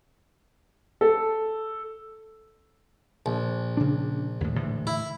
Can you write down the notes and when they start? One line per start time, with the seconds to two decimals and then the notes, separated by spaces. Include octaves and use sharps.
1.01 A4
3.26 A#1
3.77 C#3 D4
4.41 D#2 A2
4.56 A2 D3 E3
4.87 E4